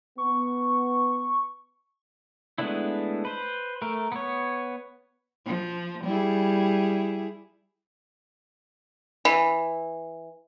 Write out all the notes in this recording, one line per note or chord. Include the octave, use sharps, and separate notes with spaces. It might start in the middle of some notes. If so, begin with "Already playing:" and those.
B3 C#6
G#3 A3 B3 D4 E4
B4 C5
A3 A#4
B3 C#5
F3
G3 E4 G#4
E3